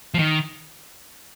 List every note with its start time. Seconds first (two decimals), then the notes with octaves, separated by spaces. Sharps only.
0.14 F3
0.19 D#3